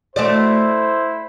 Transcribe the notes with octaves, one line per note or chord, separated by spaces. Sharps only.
A3 E4 F#4 C5 D5